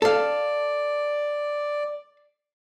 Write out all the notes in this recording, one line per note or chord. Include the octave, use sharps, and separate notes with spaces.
A4 D5 F5